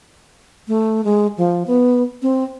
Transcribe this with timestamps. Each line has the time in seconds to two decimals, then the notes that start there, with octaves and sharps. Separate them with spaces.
0.68 A3
1.04 G#3
1.37 F3
1.67 B3
2.22 C4